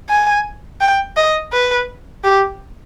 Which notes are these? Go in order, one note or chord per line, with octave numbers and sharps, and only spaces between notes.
G#5
G5
D#5
B4
G4